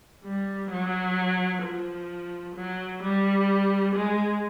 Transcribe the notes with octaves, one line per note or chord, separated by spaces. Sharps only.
G3
F#3
F3
F#3
G3
G#3